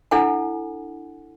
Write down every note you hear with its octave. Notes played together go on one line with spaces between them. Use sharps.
D4 E4 A4 F#5 G#5